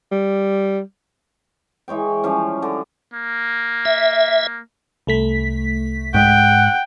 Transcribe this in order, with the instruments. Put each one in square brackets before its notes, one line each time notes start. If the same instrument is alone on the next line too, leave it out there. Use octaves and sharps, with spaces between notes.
[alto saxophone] G3
[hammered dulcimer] E3 G#3 C#5 G5
F3 G3 C#4
D3
[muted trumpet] A#3
[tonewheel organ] E5
[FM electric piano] C2 A3 B6
[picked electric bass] G#2 G#3 [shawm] F#5 [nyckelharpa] G5